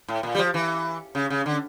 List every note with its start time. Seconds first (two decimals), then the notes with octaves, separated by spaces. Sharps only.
0.08 A2
0.23 A#2
0.35 G3
0.38 F3
0.54 E3
1.15 C#3
1.30 C#3
1.46 D3